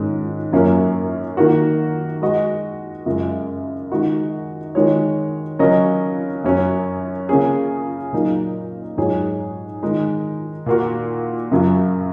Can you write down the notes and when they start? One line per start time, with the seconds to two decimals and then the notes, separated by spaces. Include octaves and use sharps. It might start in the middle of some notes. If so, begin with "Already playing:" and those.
Already playing: G#2 D#3 G#3 C#4
0.52 F#2 F#3 A#3 C#4
1.37 D#3 A#3 F#4
2.22 G#3 F#4 D#5
3.06 F#2 C#3 G#3
3.90 D#3 G#3 D#4 F#4 A#4
4.75 D#3 G#3 F#4 C#5
5.59 C#3 F#3 C#4 A#4 D#5
6.44 F#2 F#3 C#4
7.29 C#3 A#3 C#4 G#4
8.12 A#2 F#3 A#3 D#4
8.97 G#2 F#3 D#4 G#4 C#5
9.82 D#3 G#3 D#4
10.66 A#2 A#3 F#4
11.51 F#2 C#3 F#3